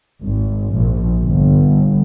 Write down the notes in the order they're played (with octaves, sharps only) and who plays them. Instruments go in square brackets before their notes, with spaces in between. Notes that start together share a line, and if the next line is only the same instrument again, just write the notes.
[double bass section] G#1
A#1
G1